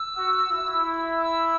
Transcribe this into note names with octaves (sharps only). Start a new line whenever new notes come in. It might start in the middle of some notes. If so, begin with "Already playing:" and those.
Already playing: E6
F#4
E4
E6